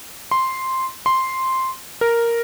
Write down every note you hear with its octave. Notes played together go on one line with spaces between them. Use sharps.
C6
C6
A#4